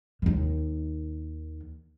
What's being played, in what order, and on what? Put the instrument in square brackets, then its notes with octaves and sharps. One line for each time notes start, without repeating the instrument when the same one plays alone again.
[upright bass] D#2 D#3